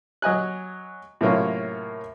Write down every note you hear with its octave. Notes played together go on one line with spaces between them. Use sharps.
F#3 D#5 G#5 F#6
A2 C3 F#3 A#3 C#4 F4